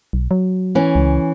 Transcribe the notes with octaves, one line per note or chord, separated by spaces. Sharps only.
B1
F#3
E3 C#4
C#2